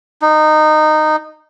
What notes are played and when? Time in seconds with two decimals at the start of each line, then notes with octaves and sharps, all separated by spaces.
0.22 D#4